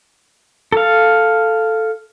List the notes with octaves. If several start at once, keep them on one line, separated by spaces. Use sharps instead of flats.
A4 F5